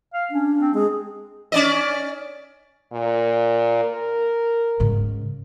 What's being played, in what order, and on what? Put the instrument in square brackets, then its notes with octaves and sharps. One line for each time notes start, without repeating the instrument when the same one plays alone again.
[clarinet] F5
[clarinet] C#4 [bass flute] D4
[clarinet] C4
[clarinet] G#3 [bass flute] G#4
[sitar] C#4 D5 D#5
[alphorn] A#2
A#4
[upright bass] G#2 C#3